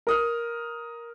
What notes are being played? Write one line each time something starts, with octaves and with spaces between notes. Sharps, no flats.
A#4 D#6 F6